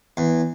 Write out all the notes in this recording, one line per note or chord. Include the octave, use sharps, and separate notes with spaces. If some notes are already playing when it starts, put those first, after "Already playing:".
E2